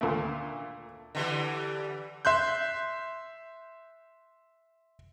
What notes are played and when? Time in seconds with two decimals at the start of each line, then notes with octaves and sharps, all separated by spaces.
0.01 D2 A#2 A3
1.15 D3 E3 G3
2.25 E5 C6 F#6 G6